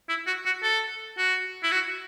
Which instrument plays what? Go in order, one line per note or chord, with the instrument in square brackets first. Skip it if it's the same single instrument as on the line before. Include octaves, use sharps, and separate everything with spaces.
[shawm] E4
F#4
F#4
A4
F#4
E4
F#4